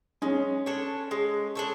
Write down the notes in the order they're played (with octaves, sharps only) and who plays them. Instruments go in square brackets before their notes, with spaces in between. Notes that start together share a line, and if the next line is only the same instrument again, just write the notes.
[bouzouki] G#3 [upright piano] C#4
[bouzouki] D4 A4 C#5
G#3
D4 A4 C#5